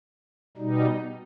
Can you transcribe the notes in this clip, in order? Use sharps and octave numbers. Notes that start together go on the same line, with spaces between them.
B2 G3 D#4